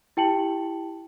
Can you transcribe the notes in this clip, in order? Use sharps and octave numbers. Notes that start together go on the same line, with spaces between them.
E4 G4 G5 A5 C#7 F#7